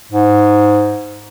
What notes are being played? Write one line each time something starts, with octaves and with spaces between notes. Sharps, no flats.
G#2